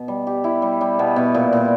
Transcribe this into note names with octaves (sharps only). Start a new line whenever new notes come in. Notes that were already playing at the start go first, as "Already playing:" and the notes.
Already playing: B2
G3
G4
E4
G3
G3
B2
B2
A#2
A#2